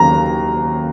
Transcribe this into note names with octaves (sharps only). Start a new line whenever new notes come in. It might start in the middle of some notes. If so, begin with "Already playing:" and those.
Already playing: D#2 C#3 F#3 A#5